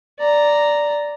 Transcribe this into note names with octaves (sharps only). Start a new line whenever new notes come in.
D5 A#5